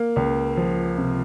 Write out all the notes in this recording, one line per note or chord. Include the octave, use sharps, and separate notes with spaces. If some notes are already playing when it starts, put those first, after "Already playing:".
Already playing: A#3
C#2
F3
C3